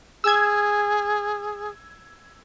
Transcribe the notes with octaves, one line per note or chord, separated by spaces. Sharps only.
G#4 E6 G#6